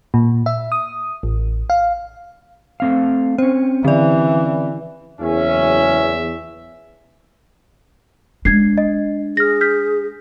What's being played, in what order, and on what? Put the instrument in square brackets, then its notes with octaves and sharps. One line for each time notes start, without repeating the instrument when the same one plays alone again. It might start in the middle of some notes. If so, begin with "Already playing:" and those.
[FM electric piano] A#2
E5
D#6
A1
F5
[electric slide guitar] A3 C4 F5
[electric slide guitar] C4 C#4 [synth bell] C5
[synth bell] D3 D5 [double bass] E3
[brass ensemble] F#1 C#4 [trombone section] E2 [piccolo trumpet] E5
[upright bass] G#3 D4 [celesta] G#6 C7
[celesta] D#5
[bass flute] G#4 [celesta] F6 A#6
[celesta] F6 G6 B6